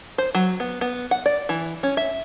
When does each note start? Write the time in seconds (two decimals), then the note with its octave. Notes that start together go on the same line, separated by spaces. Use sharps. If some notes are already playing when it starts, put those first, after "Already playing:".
0.18 C5
0.35 F#3
0.60 B3
0.81 B3
1.11 F#5
1.26 D5
1.49 E3
1.83 C#4
1.97 E5